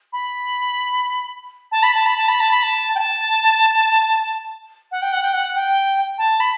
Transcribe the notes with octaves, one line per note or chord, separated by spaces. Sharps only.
B5
A5
B5
A5
B5
A5
B5
A5
B5
A5
G5
A5
F#5
G5
F#5
G5
F#5
G5
A5
B5